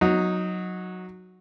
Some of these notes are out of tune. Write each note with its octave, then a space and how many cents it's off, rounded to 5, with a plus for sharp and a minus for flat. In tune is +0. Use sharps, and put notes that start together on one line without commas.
F#3 -10 D#4 +0